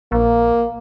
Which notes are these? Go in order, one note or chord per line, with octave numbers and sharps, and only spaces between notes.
A#1 A#3